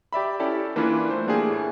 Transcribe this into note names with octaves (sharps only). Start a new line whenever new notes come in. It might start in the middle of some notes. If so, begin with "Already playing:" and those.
G4 D5 E5 B5
C#4 E4 G4 A4 D5
E3 A#3 D4 E4 F4 B4
A3 C5
A3 A#3 D4 G4 G#4
A2